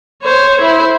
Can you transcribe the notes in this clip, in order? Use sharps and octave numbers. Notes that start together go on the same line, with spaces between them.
C5 C#5
E4 C5